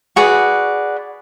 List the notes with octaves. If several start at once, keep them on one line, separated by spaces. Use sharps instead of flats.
F#4 G#4 B4 D5